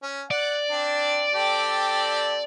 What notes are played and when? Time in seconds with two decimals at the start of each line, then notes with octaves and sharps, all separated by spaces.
0.03 C#4
0.31 D5 F#5
0.71 C4 D4
1.34 C4 G4 A4